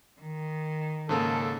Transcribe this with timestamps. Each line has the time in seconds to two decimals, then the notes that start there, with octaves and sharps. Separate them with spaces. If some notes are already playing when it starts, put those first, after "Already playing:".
0.21 D#3
1.09 G#2 C#3 A#3 A4